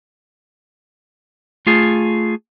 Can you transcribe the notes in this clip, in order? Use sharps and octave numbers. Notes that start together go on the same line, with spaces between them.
A3 F4 G#4